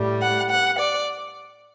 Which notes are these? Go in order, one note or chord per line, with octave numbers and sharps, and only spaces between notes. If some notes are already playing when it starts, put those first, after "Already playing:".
Already playing: A2 G3
F#5
F#5
D5